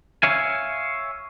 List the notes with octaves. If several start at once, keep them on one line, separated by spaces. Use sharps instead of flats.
C#5 E5 F5 G#5